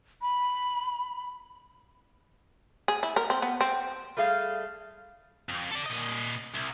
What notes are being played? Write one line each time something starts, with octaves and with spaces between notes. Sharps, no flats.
B5
G#4
E4
A#4
C4
B3
C4
G3 A3 G#4 F5
F2
A4 D5
A#2 D#5
C2